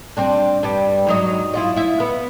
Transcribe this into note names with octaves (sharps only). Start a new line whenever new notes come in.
G3 C4 D4
G2 G3
G#2 F#3 D#5
E4 F4 D#5
E4 E5
B3